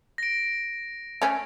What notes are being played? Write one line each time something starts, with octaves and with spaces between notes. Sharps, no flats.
A#6 D7
A3 C#4